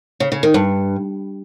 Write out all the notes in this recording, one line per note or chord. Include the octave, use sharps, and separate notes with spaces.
C#3
C#3
D#3
G2